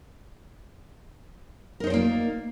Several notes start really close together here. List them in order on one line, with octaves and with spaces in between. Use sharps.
A#4 D#4 C5 D5 A#3